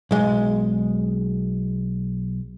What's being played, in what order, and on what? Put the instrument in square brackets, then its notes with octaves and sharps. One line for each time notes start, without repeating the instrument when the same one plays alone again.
[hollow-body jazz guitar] B1 G#3